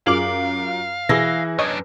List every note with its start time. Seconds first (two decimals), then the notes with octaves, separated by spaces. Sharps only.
0.07 F#2 F4 G#4 F5 D6 F#7
1.09 B2 E3 G#4 E6 A#6
1.59 F#2 D4 C#5 D#5 G#6